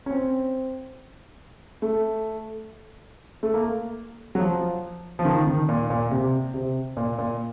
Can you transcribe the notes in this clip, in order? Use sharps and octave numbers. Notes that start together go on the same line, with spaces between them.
C#4
C4
A3
A3
A#3
F#3
F3
F3
D#3
D#3
A#2
A#2
C3
C3
A#2
A#2